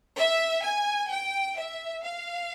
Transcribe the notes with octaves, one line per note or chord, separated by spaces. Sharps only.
E5
G#5
G5
E5
F5